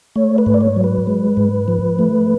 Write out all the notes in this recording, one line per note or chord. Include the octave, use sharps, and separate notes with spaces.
A3 C#5
B4
G#2
D5
C#5
F#3
B4
G#3
G#2
F3
A3